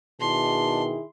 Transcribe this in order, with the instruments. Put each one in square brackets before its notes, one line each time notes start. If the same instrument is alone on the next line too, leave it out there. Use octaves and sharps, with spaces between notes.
[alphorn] B2 [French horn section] D#3 E4 G#4 [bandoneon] D4 [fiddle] C6